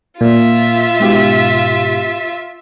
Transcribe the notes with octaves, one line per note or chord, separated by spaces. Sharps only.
A#2 F4 E5
G#2 B2 G4